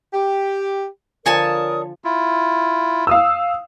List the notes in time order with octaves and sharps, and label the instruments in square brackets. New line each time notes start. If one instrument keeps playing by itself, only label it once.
[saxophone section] G4
[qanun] D3 F3 [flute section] A#4 D5 D#6 [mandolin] C#5 G#5 A5
[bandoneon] E4 F4
[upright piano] F5 D#6 E6